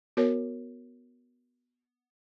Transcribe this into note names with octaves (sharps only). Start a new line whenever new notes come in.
B3 F#4 A#4 C#5